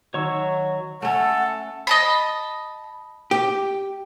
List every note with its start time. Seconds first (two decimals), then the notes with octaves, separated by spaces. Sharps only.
0.14 D#3 F#3 F#4 C#5 C#6 E6 C#7
1.02 A3 C#4 A4 F#5
1.87 D#5 A5 B5
3.31 G4